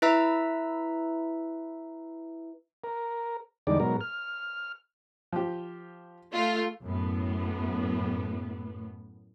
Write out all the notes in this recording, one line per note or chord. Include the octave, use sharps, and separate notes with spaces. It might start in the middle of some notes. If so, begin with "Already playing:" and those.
E4 B4 E5 A#5 E6
A#4
E2 D3 G3 G#3 D#4 D5
G#2 B2 F#3 A#4
F6
F3 G4
A3 F4
F#2 A2 B3